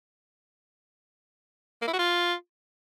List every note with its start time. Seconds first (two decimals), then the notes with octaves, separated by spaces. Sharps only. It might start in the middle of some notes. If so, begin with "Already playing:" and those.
1.82 A#3
1.88 E4
1.93 F#4
1.99 F4